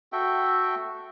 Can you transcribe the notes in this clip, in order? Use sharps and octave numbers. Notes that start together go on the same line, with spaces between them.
F#4 A4 E5 G5